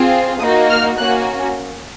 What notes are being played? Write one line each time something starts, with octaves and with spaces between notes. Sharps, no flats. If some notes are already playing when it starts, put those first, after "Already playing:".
Already playing: C4 F4 G#4
A#3 D#4 F#4 D#6
F6
A#3 C#4 F#4 F#6